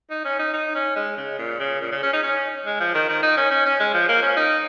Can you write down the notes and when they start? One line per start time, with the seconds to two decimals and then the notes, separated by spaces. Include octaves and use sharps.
0.10 D#4
0.25 C#4
0.39 D#4
0.53 D#4
0.75 C#4
0.96 G#3
1.17 C#3
1.38 A#2
1.60 C#3
1.81 A#2
1.92 C#3
2.03 C#4
2.13 D#4
2.23 C#4
2.66 G#3
2.80 F3
2.94 D#3
3.09 D#3
3.23 D#4
3.37 C#4
3.51 C#4
3.66 C#4
3.80 G#3
3.94 F3
4.08 A#3
4.22 C#4
4.36 D#4